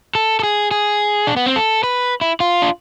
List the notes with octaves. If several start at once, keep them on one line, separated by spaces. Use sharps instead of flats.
A4
A4
G#4
G#4
D4
B3
C4
A4
B4
E4
F4
D4